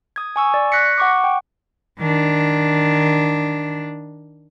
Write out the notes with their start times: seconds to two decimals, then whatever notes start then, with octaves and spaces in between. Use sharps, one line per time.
0.16 D#6 G#6
0.36 G#5 C#6 E6
0.54 D5
0.72 C#6 F#6 A#6 B6 C#7
0.98 F#5 C#6 D6
1.24 G5
2.00 D#3 D4